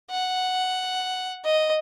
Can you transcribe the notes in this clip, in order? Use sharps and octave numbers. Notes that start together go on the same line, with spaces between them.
F#5
D#5